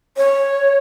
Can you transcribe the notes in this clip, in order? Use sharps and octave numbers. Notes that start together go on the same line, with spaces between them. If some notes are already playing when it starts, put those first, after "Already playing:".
C#5